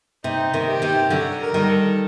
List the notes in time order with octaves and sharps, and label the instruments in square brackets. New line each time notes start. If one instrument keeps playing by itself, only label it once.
[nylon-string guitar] C3 [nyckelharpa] D#4
[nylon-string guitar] C3 D#3
[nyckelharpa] G4
[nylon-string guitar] C3 D#3
D3 F#3
[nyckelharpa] A#4
[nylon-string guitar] D#3 G3
[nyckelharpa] A4